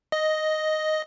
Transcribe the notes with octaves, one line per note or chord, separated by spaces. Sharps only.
D#5